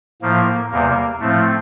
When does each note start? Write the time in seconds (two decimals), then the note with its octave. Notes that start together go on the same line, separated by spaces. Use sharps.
0.22 A2 F3 A#3
0.71 E2 C3 G3 A#3
1.20 A2 F3 A3 C4